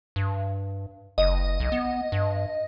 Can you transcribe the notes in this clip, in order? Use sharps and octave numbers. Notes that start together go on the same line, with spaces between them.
G2
F#1 D#5
B1
B3
G2